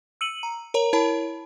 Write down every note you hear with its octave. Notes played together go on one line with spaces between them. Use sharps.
E6 C#7 D#7 F#7
A#5
A#4 C#5 A#5
E4 A#4 C#5 A5 B5